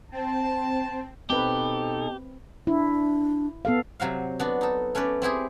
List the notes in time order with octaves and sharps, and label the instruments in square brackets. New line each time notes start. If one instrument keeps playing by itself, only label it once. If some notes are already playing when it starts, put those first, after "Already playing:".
[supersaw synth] C4 [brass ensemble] A5
[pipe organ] B2 D#4 A4 [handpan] C4 B4 [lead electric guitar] G4
[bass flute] D4 [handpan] E4
[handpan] B3 A4 F5
[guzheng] C3 F#3 F#4 F5
B3 D4 F#4
D#4 A4
A3 C#4 B4 D5
C4 E4 G4 G#4